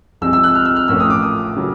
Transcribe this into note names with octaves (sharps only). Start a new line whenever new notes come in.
C2 C3 F3 G#3 C4 E6
E6
F#6
F6
E6
F6
A1 A2 F3 A#3 C#4 E6
D#6
D6
D#6
C#3 F#3